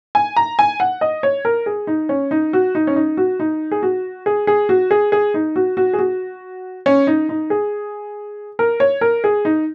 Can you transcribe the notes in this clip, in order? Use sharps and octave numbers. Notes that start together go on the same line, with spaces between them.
G#5
A#5
G#5
F#5
D#5
C#5
A#4
G#4
D#4
C#4
D#4
F#4
D#4
C#4
D#4
F#4
D#4
G#4
F#4
G#4
G#4
F#4
G#4
G#4
D#4
F#4
F#4
G#4
F#4
C#4
D#4
D#4
G#4
A#4
C#5
A#4
G#4
D#4